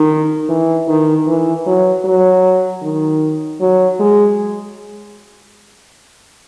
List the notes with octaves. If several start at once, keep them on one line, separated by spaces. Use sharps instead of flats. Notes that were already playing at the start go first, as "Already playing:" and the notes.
Already playing: D#3
E3
D#3
E3
F#3
F#3
D#3
F#3
G#3